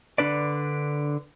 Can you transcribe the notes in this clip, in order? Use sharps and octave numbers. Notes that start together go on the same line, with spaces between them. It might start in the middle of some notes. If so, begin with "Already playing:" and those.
D3 D4 B4 D5